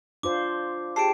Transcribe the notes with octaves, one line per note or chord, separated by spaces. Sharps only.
D4 F4 C5 D6
G4 G#4 G5 A5 C7 D7